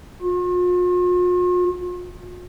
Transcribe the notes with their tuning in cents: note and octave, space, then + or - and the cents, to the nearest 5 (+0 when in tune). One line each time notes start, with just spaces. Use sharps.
F4 +45